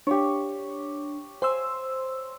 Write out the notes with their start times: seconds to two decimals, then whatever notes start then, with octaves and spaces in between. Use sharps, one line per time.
0.07 D4 G4 C#5
1.42 C5 G#5 C6 E6